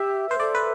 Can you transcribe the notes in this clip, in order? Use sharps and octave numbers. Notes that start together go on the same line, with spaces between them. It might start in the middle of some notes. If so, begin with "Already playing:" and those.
Already playing: G4 E5
B4 C5
A4 D5
B4